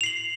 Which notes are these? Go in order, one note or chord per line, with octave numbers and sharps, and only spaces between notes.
C7 F7 F#7